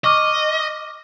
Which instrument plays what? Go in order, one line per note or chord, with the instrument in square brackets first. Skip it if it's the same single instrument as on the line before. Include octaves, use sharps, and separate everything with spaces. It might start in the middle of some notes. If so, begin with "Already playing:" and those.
[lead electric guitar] D#5 [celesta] C#6 D6 F6